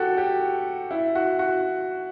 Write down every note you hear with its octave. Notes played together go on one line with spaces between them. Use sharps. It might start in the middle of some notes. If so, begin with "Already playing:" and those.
Already playing: F#4 G4 A4
G4
E4
F#4
F#4